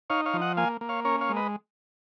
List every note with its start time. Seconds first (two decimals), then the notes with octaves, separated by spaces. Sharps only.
0.10 D#4 C#5 F5
0.26 C#5 F5
0.34 F3
0.41 D#5 F#5
0.57 A#3 F5 G#5
0.81 A#3
0.89 C#5 F5
1.05 C#4 A#4 C#5
1.21 C#5 F5
1.29 G#3
1.36 B4 D#5